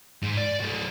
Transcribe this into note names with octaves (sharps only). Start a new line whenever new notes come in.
G#2
D5
F#3 A3